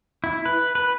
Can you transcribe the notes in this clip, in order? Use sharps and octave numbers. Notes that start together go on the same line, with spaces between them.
E4
B4
B4